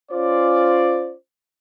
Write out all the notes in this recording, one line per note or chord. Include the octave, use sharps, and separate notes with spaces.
C#4 F4 C5 D5